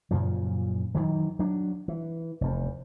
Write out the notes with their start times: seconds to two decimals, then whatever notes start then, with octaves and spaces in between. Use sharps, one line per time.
0.11 F#2 A#2 C#3 F3
0.95 D#3 E3 F#3
1.39 F#3 D4
1.88 E3
2.41 F1 E2